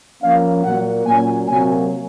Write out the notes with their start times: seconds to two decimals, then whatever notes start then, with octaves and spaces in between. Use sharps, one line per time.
0.22 F3 A#3 C#4 F5
0.64 A#2 F#3 A#3 F#5
1.06 A#2 F#3 C#4 G#5
1.48 C3 F#3 A#3 G#5